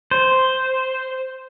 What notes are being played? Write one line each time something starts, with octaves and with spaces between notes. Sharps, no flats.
C5